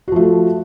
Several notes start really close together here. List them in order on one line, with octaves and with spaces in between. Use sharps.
F#4 F3 A3